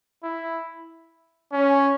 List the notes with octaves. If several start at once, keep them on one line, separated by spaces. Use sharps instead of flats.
E4
C#4